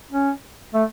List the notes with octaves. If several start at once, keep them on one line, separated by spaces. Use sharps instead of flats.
C#4
A3